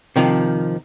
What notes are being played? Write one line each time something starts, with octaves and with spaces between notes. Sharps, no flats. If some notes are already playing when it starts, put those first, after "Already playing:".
C3 D#3 F3